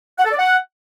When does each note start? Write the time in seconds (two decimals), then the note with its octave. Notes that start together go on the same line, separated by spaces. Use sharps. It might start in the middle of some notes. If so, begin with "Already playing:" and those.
0.19 F#5
0.25 A4
0.32 D5
0.39 F#5